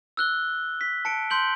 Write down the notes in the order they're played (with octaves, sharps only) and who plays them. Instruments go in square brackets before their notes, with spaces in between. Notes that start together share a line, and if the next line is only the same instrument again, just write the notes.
[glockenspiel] E6 F#6 G7
B6
A5 C#7 D7
C6 G6 F#7 G7